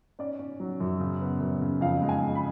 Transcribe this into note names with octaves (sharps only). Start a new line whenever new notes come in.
C#4 D5
C#4
F#3
F#2
C#3
B3
F#2
C#3
F2 F5
G#3
G#5
G#3
B5